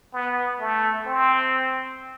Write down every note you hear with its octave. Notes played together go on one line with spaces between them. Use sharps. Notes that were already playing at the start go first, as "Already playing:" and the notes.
B3
A3
C4